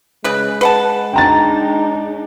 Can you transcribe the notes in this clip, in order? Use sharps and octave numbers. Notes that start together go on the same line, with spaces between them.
C#3 G#3 B4
B4 F#5 A5
D4 D#4 G5 A#5 A6